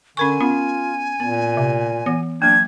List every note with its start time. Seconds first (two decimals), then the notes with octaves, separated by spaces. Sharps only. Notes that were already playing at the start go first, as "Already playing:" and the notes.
0.17 D3 C#4 A#4 G#5 C#6
0.41 B3 C#4 F4
1.20 A#2 B3
1.57 C3
2.06 E3 B3
2.42 F#3 A#3 D4 G#6